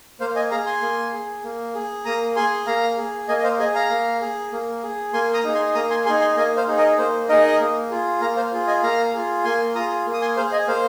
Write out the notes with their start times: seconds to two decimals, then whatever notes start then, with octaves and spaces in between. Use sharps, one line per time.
0.20 A#3 C5 F5
0.36 D#5 G#5
0.51 G#4 F5 A#5
0.66 G#5 C6
0.82 A#3
1.13 G#4
1.43 A#3
1.75 G#4
2.05 A#3 A#5 D#6
2.36 G#4 G#5 C6
2.67 A#3 F5 A#5
2.98 G#4
3.28 A#3 D#5 G#5
3.39 D#5
3.44 C5 F5
3.59 G#4 D#5 G#5
3.75 F5 A#5
3.90 A#3
4.21 G#4
4.52 A#3
4.83 G#4
5.13 A#3 G#5 C6
5.34 A#5 D#6
5.44 D#4 G#4
5.54 G#5 C6
5.75 A#3 A#5 D#6
5.90 G#5 C6
6.06 G#4 G#5 C6
6.09 D#4
6.21 G#5 C6
6.37 A#3 D#5 G#5
6.57 C5 F5
6.67 D#4 G#4
6.77 A#4 D#5
6.98 A#3 C5
7.29 D#4 G#4 A#4 D#5
7.60 A#3
7.91 F4 G#4
8.21 A#3 F5 A#5
8.36 C5 F5
8.52 F4 G#4
8.67 D#5 G#5
8.83 A#3 F5 A#5
9.14 F4 G#4
9.44 A#3 G#5 C6
9.75 F4 A#5 D#6
9.80 G#4
10.06 A#3
10.13 D#6
10.21 G#5 C6
10.37 G#4 C5 F5
10.52 D#5 G#5
10.68 A#3 C5 F5